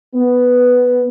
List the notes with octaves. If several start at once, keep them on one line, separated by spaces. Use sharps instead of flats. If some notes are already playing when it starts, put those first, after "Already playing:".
B3